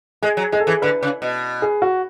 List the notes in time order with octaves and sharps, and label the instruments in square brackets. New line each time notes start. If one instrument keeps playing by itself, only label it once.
[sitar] G#3 [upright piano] G#4
[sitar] F#3
[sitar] G#3 [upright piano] G#4
[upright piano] A4
[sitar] E3 [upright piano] G#4
[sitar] D3 [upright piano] B4
[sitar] C#3
B2
[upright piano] G#4
F#4